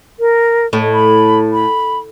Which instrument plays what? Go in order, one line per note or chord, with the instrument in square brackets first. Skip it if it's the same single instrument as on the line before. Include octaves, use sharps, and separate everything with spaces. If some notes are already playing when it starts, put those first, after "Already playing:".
[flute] A#4
[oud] A2
[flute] B5
B5